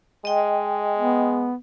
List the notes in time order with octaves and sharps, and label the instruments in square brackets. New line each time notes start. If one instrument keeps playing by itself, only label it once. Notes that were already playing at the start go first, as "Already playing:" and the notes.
[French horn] G#3 [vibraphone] D#5 G5
[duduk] B3